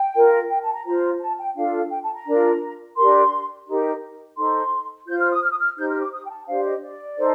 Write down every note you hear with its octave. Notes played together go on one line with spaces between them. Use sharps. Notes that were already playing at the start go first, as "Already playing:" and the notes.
Already playing: G5
F4 A#4
G5
A5
A#5
F4 C5 A#5
A5
G5
D4 F4 A4 F5
G5
A5
A#5
D4 F4 A#4
D4 G4 A#4 C6
D#4 G4 A#4
D#4 A4 C5 C6
F4 C5 G6
F6
D#6
F6
D#6
F6
D#4 G4 C5 G6
F6
D6
D#6
G5
A5
D4 G4 C5 F5
D#5
D5
D#4 A4 C5